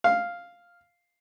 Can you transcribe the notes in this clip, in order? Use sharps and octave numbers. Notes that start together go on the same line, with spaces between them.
F5